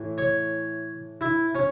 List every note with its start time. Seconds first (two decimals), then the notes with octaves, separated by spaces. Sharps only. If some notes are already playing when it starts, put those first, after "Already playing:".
Already playing: A2 E3
0.18 C#5
1.21 E4
1.55 C#4